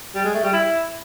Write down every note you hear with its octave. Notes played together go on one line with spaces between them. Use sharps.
G3
G#3
A3
G3
E4